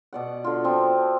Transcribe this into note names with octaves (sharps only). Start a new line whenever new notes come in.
B2 D5 F#5
D3 F4
F3 C4